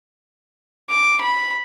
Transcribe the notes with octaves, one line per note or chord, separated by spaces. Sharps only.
D6
B5